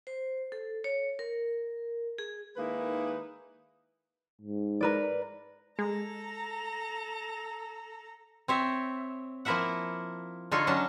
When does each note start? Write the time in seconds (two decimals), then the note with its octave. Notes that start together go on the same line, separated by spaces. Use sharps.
0.07 C5
0.52 A4
0.84 C#5
1.19 A#4
2.18 G#4
2.57 D#3 G#3 A#3 D#4 E4 B4
4.41 G#2
4.81 A#4 B4 D5
5.79 G#3 A4 A#5
8.48 C4 C#5 E5
9.45 F3 A#3 E4 A#4 E5 F#5
10.51 D3 D#4 F4 A4 C#5
10.67 F#3 C#4 D4 A5